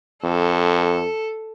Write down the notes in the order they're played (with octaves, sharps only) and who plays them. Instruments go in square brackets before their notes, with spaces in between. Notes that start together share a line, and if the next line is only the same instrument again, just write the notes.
[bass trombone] F2 [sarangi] A4